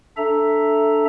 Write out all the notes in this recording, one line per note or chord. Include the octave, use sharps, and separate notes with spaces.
D4 A4 E5 A#5